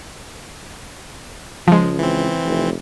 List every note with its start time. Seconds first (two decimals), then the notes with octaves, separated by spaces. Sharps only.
1.68 C#2 F3 G#3
1.99 E3 C4
2.45 F1